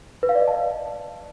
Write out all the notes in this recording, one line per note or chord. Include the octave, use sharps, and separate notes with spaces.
B4
F5
D5
D#5
A5